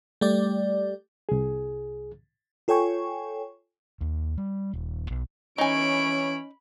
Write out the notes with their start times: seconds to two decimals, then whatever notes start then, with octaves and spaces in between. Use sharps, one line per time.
0.21 G3 A3 G4 D5
1.29 C2 G#4
2.68 F4 A4 C#5 G5 G#5 C#6
4.01 D#2
4.38 G3
4.73 D#1
5.10 B1
5.58 E3 C#4 D#4 C#5 G#5 B5 D7